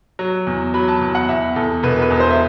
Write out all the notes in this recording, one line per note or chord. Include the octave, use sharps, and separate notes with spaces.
F#3
E2
F#3 B5
A5
E2
F#5
E2 E5
E2 A4
E1 B4
B4
E2
C5
E5